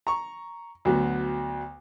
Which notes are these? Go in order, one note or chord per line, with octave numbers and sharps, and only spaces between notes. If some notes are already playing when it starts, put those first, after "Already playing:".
A#5 C#6
D2 F#3 B3